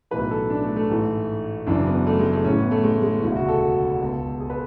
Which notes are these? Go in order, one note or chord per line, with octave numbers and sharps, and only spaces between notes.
B1 A2 E3 B4
A4
D4
A3
A3
A1 G#2 E3
F#1 F#2 E3 D4
B3
A3
G#3
A3
A1 A2 E3 C#4
B3
A3
G#3
G#3
E1 D2 C#3 E4
F#4
A4
C#2 B2
G#4
B4